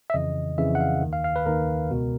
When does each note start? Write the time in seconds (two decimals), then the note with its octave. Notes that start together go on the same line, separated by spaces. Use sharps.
0.10 E5
0.14 F2 C#3 E3 D#5
0.58 F2 C#3 E3 E5
0.75 F#5
0.81 F5
1.02 D#2 D#3
1.13 F5
1.24 F5
1.36 B4
1.46 D#2 D#3 A#4
1.90 C#2 B2